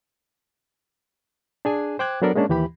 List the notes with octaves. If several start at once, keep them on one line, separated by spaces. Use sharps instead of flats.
D4 G#4 G#5
C5 G5 D6 F#6 G#6
F#3 B3 D4 A4 A#4 D5
G#3 A#3 C#4 D4
D#2 E3 G4 B5